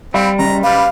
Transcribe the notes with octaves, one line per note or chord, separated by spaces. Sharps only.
G3 C4 F5 B5
F#1 A#5
G3 B4 F5